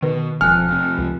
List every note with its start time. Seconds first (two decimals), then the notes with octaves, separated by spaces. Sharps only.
0.02 B2 D#3 B4
0.41 E1 F2 G#5 F6 F#6
0.68 F2 C3
0.98 C#2